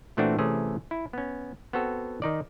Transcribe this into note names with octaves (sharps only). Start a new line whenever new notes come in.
A#2 E3 A3 C4 D4 F#4
C3 E3 A3 C#4 G#4
E4
B3 C#4
B3 C4 F#4 A4
D#3 D#4 D5